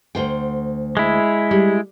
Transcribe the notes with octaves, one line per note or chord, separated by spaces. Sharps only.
D2 C5 G5
G#3 E4
G3